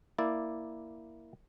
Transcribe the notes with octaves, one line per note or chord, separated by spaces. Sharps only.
A#3 E4 D5